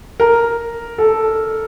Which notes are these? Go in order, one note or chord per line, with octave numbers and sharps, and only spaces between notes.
A#4
A4